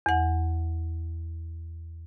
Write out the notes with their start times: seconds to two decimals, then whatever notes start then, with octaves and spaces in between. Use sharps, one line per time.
0.06 E2 F#5